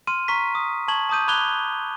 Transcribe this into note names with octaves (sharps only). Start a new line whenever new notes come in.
C6 F6 D#7
A#5 C#6 F6 B6
D#6
A5 C#6 G#6 F#7
A5 D6 D#6 G6 D#7
B5 D6 F#6 G#6 F7 G7